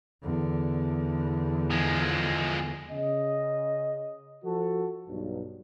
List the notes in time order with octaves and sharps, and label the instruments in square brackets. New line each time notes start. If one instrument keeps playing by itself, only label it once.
[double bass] E2 D3
[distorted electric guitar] F3 G#3
[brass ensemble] C#3 D#5
F3 F#4 A4
B1 G2